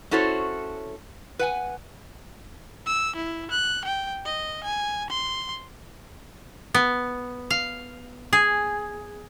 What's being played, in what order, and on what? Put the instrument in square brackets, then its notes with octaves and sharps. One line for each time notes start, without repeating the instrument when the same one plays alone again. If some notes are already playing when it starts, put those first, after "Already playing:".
[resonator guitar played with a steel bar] C#4 E4 F#4 A4 C5 C#5
B4 F#5 G#5
[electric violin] E6
E4
F#6
G5
D#5
G#5
C6
[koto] B3
F5
G#4